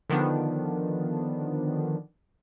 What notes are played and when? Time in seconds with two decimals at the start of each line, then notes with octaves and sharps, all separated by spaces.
0.10 D3 D#3 F3 B3 D4